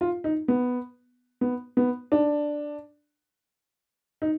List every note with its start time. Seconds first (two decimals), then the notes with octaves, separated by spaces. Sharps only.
0.01 F4
0.24 D#4
0.48 B3
1.41 B3
1.77 B3
2.12 D4
4.22 D#4